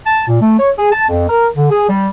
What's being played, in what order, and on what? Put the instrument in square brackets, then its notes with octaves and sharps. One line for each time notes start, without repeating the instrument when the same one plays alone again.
[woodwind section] A5
A#2
A3
C#5
G#4
A5
F2
A#4
D3
G#4
G3